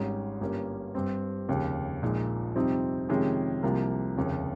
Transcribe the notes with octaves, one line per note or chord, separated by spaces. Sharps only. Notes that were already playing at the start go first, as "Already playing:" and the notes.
Already playing: G#1 G#2 G3 C#4
G1 G2 G3 A#3 C#4
G2 G3 C4
F1 D#2 C#3 G3
A#1 A#2 G#3 D#4
F2 C3 G3 C4 D#4
F2 C3 D#3 G#3 C#4
C2 C3 F3 A#3
F1 D#2 C#3